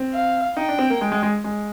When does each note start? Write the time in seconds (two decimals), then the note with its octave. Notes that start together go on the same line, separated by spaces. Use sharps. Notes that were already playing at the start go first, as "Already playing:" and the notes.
Already playing: C4
0.13 F5
0.57 D#4 G5
0.68 D4
0.78 C4
0.90 A#3
1.01 G#3
1.12 G#3
1.23 G#3
1.44 G#3